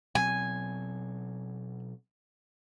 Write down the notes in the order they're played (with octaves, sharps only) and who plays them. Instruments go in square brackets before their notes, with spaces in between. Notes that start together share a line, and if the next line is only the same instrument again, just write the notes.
[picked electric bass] B2 F#3 C4 [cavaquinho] G#5